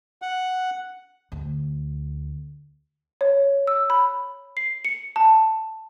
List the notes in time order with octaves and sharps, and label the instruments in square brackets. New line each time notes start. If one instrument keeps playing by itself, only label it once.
[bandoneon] F#5
[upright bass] D2
[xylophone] C#5
E6
B5
C7
C#7
A5